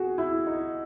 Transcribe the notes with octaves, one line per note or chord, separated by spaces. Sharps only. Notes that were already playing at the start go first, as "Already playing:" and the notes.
Already playing: F#4 G#4
E4
D#4